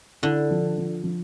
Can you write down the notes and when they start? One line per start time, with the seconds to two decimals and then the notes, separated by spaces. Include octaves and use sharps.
0.23 D3 E4
0.51 F3
0.78 F3
1.04 F3